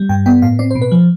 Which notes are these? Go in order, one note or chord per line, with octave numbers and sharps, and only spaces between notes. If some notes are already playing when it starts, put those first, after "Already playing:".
Already playing: G3
G2 G5
B3 G5
A2 F5
C4 D5
C5
B2
B4
F3